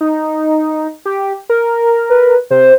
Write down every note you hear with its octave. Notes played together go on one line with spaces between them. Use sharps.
D#4
G4
A#4
B4
C3 C5